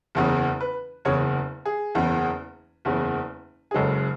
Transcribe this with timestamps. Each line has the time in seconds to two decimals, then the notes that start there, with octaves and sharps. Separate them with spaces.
0.15 F#1 E2 C#3
0.61 B4
1.05 F#1 E2 C#3 C#5
1.65 G#4
1.95 F#1 E2 C#3
2.85 F#1 E2 C#3
3.71 G#4
3.74 F#1 F#2 C#3 G#3 A4